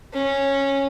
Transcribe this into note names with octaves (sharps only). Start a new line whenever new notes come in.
C#4